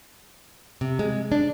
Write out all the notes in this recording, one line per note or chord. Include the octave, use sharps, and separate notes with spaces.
C3
G#3
D4